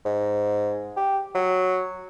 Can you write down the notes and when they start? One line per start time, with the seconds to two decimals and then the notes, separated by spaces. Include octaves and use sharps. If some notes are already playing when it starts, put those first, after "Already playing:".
0.05 G#2
0.96 G4
1.35 F#3